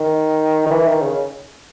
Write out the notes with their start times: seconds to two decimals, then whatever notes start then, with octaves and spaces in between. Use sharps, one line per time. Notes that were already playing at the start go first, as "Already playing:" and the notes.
Already playing: D#3
0.66 D#3
0.71 E3
0.87 D#3
1.02 C#3